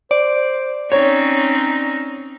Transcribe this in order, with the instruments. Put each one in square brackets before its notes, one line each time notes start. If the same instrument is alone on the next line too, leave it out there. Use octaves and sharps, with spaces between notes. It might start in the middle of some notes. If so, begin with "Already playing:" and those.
[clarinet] C5 [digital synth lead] D5
[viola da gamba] C4 C#4 D#4 [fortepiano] C#5 [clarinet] A#5